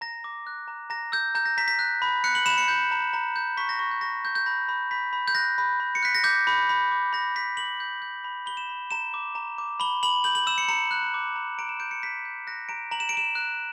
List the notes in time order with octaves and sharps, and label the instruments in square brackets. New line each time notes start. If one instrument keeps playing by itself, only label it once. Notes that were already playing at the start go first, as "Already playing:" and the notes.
[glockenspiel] A#5 A#6
D6
F#6
A#5
A#5 A#6
E6 G6
A#5 G6
A#6
A#5 B6
B6
F#6
B5
F#6 C#7
F#7
B5 E7
C#7
G6
A#5
A#5
G6
C#6 B6
A#6
C#6 A#6
G6
C#6 A#6
C#6 G6
G6
B5 A#6
B5
B5 B6
B5
G6
F#6 A#6
B5
B5
C#7
F#6 B6
A#6
D6 G6
B5
B5
D6
B5 A#6
B5 B6
D6 F#7
G6
G6
B5
B5 G7
E7
B5
A#5 E7
D6
A#5
D6
B5 G7
B5 F#7
G6 F#7
F#7
E6 E7
C#7
A#5 C#7
F#6
D6
A#5
A#5 D7
E7
G6 D7
C#7
G6 B6
G6
F#6 A#6
A#5 D7
A#5 F#7
E7
D7
A#5 E7
F#6